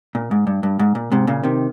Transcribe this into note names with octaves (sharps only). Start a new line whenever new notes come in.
A#2
G#2
G2
G2
G#2
A#2
G#2 C3
A#2 C#3
C3 D#3